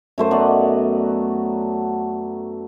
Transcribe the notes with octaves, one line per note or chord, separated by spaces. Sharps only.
F#2 A3 C5
F#3 B3 D5 D#5